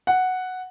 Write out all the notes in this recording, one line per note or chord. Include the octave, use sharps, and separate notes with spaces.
F#5